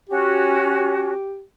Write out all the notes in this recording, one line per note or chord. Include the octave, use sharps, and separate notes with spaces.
C#4 F#4 G4